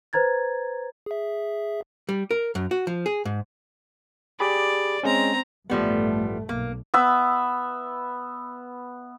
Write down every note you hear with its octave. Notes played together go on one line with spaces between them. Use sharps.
B4 C5 A#5 G#6 A6
G#4 E5
G3
A#4
F#2
F#4
F3
G#4
G#2
G4 G#4 D5 B5
G#3 C4 C#4 A#5
A1 G2 F3 G3 A3 B3
B1 A#3
B3 E5 E6